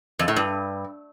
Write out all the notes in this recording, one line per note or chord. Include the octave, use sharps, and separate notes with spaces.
F2
A2
G2